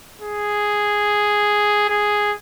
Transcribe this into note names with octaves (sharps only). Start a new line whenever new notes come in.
G#4
G#4